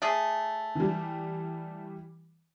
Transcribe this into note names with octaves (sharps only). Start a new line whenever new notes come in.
A3 G#4
E3 G3